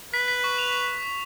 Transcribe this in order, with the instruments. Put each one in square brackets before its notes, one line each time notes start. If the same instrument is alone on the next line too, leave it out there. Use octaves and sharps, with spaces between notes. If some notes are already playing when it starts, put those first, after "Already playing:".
[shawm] B4 [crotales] B6
[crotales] B6
C#6
F7